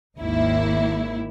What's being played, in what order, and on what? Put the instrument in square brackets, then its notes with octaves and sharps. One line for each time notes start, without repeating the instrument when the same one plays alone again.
[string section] G#1 D#2 E4